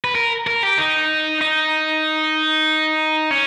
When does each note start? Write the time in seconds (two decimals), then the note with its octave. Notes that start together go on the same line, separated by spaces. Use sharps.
0.04 B4
0.15 A#4
0.47 A#4
0.63 G4
0.78 D#4
1.41 D#4
3.31 C#4